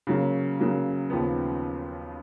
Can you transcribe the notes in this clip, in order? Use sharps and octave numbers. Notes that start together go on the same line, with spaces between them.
C#3 F#3 A#3
C#3 F#3 A#3
D#2 C#3 F3 B3